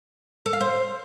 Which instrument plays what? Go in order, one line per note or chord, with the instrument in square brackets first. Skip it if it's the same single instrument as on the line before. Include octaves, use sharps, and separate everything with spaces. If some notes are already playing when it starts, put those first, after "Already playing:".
[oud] A4
F5
C5